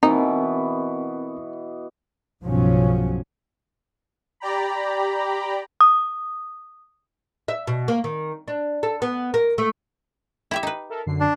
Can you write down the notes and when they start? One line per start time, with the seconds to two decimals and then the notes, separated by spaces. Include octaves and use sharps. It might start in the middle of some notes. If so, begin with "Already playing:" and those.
0.03 B2 E3 B3 C4 D#4 A#4
2.43 B1 G2 C#3 F3 F#3 C#4
4.40 G4 D5 G5 A#5 B5
5.81 D#6
7.48 E5
7.67 B2
7.88 A#3
8.04 D#3
8.48 D4
8.83 A4
9.02 B3
9.34 A#4
9.58 A3
10.51 E4 G4 E5
10.63 D#4 B4
10.90 A4 A#4 E5
11.06 F#2 D3 C7
11.20 D4